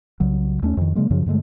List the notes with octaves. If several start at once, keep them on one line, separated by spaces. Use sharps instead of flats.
C2 C#3 F#3
D#2 A3 C4 C#4
F2 D#3
C#3 F#3 G#3 A#3
F#2 C#3 F3
G2 D3 G#3 A3